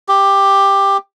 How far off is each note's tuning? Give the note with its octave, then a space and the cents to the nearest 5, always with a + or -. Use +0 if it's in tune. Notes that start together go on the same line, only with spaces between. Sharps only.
G4 +10